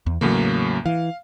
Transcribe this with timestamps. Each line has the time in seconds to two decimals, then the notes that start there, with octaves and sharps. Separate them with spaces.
0.06 E2
0.21 E2 A2 C#3 F#3 A#3
0.86 E3 F5